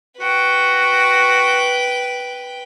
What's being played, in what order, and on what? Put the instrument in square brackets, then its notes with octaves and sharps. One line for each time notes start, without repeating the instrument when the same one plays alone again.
[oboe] F#4 [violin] B4 G5